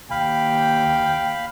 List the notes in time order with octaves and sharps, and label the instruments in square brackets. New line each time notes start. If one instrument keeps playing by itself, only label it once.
[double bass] D#2 [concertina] F5 B5 [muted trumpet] G5